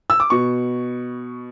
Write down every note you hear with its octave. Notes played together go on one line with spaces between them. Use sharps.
E6
D6
B2 C#6